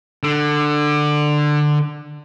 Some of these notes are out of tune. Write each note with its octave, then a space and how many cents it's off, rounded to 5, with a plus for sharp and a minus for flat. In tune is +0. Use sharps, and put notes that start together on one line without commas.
D3 +15